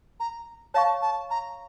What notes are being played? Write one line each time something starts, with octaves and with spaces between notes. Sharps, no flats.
A#5
C#5 F5 A5 C#6
A5
A#5